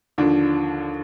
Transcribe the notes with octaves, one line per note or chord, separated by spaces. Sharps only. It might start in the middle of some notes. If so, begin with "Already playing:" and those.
D#2 D3 F3 D4